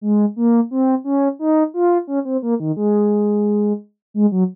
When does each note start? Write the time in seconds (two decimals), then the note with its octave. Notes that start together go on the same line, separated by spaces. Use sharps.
0.01 G#3
0.36 A#3
0.71 C4
1.04 C#4
1.39 D#4
1.74 F4
2.07 C#4
2.25 C4
2.42 A#3
2.60 D#3
2.77 G#3
4.14 G#3
4.32 F#3